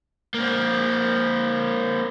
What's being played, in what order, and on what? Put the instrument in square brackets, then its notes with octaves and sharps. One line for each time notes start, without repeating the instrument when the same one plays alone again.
[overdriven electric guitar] A#3 C4